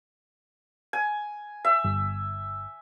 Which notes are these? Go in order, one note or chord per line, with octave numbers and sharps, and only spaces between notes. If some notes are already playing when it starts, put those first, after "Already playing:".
G#5
E5
G1